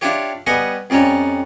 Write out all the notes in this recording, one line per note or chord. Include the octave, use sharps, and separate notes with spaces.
D4 E4 F4 G4 C#5
G3 B3 D#5 G#5 C#6
F2 G3 C#4 D#4 C#5